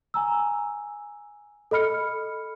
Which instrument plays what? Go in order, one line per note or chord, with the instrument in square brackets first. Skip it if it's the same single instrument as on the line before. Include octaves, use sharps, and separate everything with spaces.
[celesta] G#5 A#5 E6
A4 D#5 B5 F6 C#7